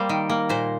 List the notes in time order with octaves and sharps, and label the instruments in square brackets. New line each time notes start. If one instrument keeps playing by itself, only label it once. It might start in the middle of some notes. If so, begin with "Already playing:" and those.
Already playing: [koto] G3 A#3 C5
D#3
A#3
A#2 C5